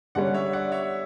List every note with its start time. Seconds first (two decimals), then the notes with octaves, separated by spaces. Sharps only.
0.15 D3 G3 C#4 D5 F#5
0.34 C#5 E5
0.53 D5 F#5
0.72 C#5 E5